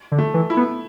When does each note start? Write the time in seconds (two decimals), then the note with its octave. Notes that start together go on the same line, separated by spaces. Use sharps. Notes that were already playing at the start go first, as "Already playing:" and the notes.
0.12 D3
0.18 A3
0.34 E3
0.50 E4
0.57 B3